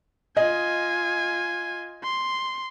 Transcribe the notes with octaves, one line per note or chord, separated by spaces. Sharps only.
F4 D#5 G#5
C6